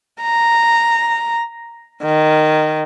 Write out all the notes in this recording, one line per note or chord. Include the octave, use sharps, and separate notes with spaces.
A#5
D#3